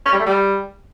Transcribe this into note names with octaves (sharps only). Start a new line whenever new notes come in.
C#4
G3
A3
G3